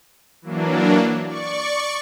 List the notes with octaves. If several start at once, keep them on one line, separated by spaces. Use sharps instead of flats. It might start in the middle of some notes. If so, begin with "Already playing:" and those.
E3 F#3 A#3 D4
D5 C#6